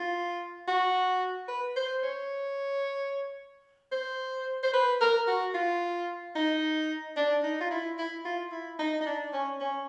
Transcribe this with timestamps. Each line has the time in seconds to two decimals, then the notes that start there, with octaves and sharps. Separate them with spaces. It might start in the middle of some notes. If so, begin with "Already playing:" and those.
Already playing: F4
0.68 F#4
1.48 B4
1.76 C5
2.03 C#5
3.92 C5
4.63 C5
4.74 B4
5.01 A#4
5.28 F#4
5.54 F4
6.36 D#4
7.16 D4
7.44 D#4
7.60 F4
7.71 E4
7.98 E4
8.25 F4
8.52 E4
8.79 D#4
9.01 D#4
9.06 D4
9.33 C#4
9.60 C#4